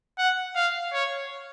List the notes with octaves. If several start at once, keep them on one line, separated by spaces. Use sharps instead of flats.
F#5
F5
C#5